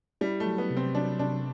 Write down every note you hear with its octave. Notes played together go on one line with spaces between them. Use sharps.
G3 E4
A3
F#3
B3
C3
C4
F#3 D4
C3 D4